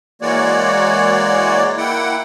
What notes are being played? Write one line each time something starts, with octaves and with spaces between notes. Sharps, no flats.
E3 G#3 A#3 F#4 C#5 D5
A#3 E4 F#5 G5